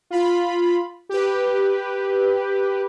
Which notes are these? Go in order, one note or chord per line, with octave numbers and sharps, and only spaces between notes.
F4 B5
G4 B4